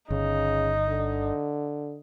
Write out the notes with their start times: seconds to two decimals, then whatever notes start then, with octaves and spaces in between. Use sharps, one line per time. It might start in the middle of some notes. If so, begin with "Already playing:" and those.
0.10 G1 C#3 D#4
0.88 D3